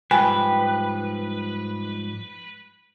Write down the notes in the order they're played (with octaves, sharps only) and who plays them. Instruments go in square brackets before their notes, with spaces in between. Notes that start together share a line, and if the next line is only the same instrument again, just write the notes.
[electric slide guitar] G#2 F3 G3 [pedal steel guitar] B4 [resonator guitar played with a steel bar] G5 [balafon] G#5